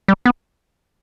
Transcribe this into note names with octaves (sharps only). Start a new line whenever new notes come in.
G3
B3